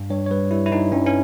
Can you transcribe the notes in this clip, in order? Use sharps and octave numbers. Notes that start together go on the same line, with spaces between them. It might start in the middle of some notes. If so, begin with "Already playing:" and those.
Already playing: G2
G2 C#5
C#5
G3 B4
G3 E4
E4
G2 D#4
G2 C#4
C#4